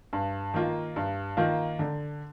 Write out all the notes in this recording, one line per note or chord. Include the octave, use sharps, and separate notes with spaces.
G2
D#3 A#3 F4
G2
D#3 A#3 F4
D3